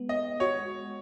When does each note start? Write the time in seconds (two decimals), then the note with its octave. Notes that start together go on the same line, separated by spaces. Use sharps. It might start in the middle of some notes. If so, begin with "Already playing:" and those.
Already playing: G#3 B3
0.09 D#5
0.40 F#4 C#5